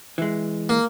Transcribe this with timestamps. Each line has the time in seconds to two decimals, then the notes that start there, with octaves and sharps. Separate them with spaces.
0.18 E3 G#3
0.69 A#3